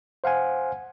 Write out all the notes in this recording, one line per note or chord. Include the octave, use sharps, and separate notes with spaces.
C5 F5 F#5 G#5